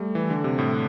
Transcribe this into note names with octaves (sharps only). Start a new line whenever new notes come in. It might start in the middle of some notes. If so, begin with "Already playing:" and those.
Already playing: G3 A3
E3
D3
C3
A2